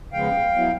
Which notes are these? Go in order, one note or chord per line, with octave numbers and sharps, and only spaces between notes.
C#3 F3 G#3 B3 F5 G5
F#3 B3 E4